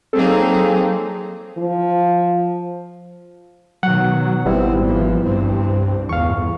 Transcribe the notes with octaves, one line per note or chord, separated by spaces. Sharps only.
F#3 A#3 C4 D#4 G#4 A4
F3
B2 D#3 F#3 F#5
G#1 G3 B3 C4 E4
E3 F3
C2 G2 C4
G1 E2 A2 F5 C#6